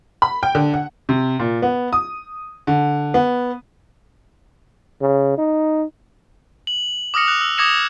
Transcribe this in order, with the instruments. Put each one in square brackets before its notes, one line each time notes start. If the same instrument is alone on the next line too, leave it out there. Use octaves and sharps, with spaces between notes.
[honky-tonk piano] B5
G5
D3
F#5
[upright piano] C3
A#2
B3
D#6
D3
B3
[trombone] C#3
D#4
[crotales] F#7
D6 D#6 F6 A#6 C#7
F#6 F7
E6
D6 D#6 G#6 A#6 C#7 E7